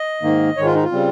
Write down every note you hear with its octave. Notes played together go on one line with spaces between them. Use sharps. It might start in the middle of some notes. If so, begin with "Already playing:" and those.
Already playing: D#5
G#2 D#3 A#3
G#2 D#3 G#3 C#5
F4
D#4
F4
C#3 G3 C4